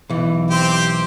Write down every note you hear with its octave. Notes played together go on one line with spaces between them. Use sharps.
B1 E3
C4 G4 C5